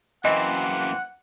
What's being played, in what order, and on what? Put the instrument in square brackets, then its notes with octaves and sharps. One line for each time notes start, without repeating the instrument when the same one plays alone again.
[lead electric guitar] F#2 A#3 [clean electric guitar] E3 C4 [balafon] D#5 [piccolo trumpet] F#5